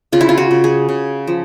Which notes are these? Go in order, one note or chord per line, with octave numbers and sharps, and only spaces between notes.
C#3 F4
E4
F4
F#4
C#3
G#4
C#3
F3